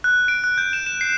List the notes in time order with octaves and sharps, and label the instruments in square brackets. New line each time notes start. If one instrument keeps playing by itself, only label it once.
[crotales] F#6
D7
F#6
G6
E7
E7
C7